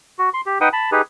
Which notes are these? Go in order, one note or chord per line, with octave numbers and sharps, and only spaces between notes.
F#4
C6
G4
D#4 B4 F#5 G5 D#6
A5 B5
D#4 G4 G#4 B4